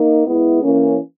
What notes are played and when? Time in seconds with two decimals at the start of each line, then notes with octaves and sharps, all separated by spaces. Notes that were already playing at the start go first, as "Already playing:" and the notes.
Already playing: A#3 D#4
0.25 G#3 B3 E4
0.61 E3 A#3 C#4